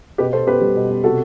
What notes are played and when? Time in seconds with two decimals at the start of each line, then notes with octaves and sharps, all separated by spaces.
0.18 B2 G4 B4
0.33 B2 A4 C5
0.47 B3 G4 B4
0.61 G3
0.75 B2
0.89 B2
1.04 C3 F#4 A4